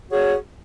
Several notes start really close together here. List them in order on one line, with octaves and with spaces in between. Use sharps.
F#4 G#4 C#5